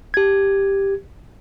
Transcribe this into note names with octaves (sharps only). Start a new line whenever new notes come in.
G4 G#6